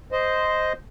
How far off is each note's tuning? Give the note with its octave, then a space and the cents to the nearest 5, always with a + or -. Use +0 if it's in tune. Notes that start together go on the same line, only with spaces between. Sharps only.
C5 -10 D#5 +0